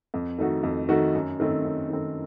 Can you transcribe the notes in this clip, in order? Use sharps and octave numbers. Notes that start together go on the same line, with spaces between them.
F2
D#3 A3 D#4 F#4
F2
D#3 A3 D#4 F#4
F#2
D#3 A3 C4
F#2
D#3 A3 C4